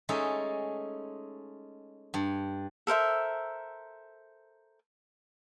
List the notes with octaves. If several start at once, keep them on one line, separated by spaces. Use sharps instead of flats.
G#3 A3 C#4 D#4 A4
G2
A4 A#4 C5 E5